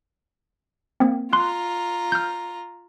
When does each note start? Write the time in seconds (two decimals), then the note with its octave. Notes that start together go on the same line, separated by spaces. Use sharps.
1.00 A#3 C4
1.33 F4 A#5 C6 F#6
2.12 F6 G6